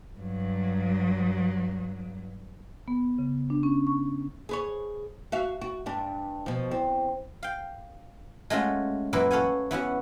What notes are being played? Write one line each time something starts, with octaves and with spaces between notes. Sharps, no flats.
G2 F#3
B3
C#3
D4
C#4
C#6
G#4 B4 C#5
F#4 E5 F5
F#4
G2 G3 D4
B2 F3
E2 C4
F5 G5
G#3 A3 C#4 F4 F#4
F#2 A#2 E3 E4 B4
A4 C#5 F5 F#5 G#5
E3 B3 C#4 F#4